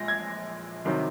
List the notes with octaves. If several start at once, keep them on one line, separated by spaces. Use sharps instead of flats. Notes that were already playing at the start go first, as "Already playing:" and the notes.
Already playing: A#1 G#3 A#6
G#6
C2 C3 D#3 F#3